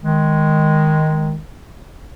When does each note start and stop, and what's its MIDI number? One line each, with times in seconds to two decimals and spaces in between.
0.04 1.37 51
0.04 1.37 56